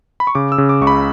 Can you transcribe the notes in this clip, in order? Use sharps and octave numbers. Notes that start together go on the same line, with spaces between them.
B5
C#6
C#3 D6
E6
C#3
D6
C#2 C#6
B5